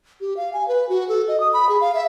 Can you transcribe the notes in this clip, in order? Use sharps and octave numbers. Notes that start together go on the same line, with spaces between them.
G4
F5
G#5
B4
F#4
A4
D#5
D#6
B5
G#4
F5
E5